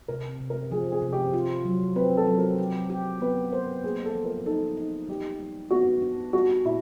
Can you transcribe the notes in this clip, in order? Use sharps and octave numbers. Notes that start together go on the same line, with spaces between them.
C3 A#4
C3
A#4
F3 G#4
G#4
C3
G4
F4
F#3
C4 B4
A4
F#3
A#4
G4
G4
B3 B4
A#4 C5
A#3 G#4
A4
F3
A#4
D#4 A4
D#4
G3 G4
G3
B3 F#4
D4
G3 F#4
A#2 E4